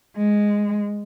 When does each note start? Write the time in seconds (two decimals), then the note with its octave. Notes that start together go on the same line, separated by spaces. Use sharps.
0.17 G#3